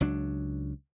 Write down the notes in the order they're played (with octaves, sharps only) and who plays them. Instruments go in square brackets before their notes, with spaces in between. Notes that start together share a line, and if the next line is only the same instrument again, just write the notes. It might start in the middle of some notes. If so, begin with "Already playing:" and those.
[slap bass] C#2 F#3 D4